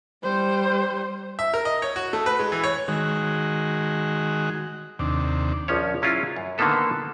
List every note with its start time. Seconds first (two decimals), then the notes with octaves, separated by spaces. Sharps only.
0.23 G3 C5
1.39 E5
1.54 A#4
1.65 D#5
1.82 C#5
1.96 F#4
2.13 A3
2.26 B4
2.39 G#3
2.52 E3
2.64 C#5
2.88 D#3 G#3 F#4
4.99 D#2 C3 D4
5.68 A#1 F3 C#4 C#5
6.02 F#3 C#4 E4 F4 G#4
6.36 F#2
6.58 D3 D#3 A#3 B3 A4 B4